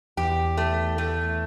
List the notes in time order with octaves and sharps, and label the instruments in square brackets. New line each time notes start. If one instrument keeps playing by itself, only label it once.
[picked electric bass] E2 [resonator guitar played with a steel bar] G4
[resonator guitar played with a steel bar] A3
A3